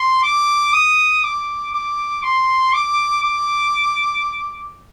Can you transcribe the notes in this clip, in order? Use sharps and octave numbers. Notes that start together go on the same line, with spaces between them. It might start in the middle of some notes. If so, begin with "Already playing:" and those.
Already playing: C6
D6
D#6
D6
D6
C6
D6
D6